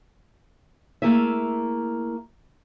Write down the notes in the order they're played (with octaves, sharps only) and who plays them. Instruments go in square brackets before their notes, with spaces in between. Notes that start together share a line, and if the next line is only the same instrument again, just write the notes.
[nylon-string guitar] A3 A#3 E4 G#4 E5